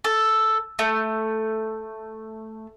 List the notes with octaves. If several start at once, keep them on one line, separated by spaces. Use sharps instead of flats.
A4
A3